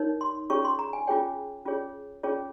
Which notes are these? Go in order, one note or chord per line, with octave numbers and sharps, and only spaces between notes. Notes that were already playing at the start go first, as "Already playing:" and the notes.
Already playing: D#4 A#4 C#5
C6
C#4 F4 G#4 C#5 C#6
C6
A#5
G#5
C#4 F4 G#4 C#5 G5
C#4 F4 G#4 C#5
C#4 F4 G#4 C#5